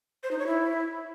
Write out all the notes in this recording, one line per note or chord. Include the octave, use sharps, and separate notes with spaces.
C5
D#4
C#5
E4